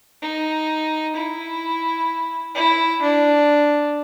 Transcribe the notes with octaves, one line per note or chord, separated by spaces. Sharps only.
D#4
E4
E4
D4